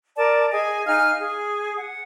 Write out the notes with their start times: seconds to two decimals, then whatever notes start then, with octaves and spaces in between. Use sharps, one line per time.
0.16 A#4 D5 A5
0.51 G#4 D#5 G#5
0.85 D#4 F5 G#5 F6
1.17 G#4
1.78 F#5